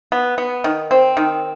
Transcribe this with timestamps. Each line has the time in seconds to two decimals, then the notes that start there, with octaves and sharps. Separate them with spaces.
0.12 B3
0.38 B3
0.64 D#3
0.91 C4
1.17 D#3